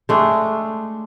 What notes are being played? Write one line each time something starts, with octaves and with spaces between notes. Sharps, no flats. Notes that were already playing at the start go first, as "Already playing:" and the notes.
G#3 A3 D4